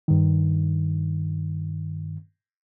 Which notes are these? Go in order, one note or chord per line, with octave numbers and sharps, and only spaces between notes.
G2 D#3